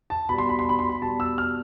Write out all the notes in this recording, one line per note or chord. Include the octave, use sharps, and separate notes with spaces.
A5
B2 G3 B5
C6
B5
C6
B5
C6
B5
B2 G3 A5
E6
F6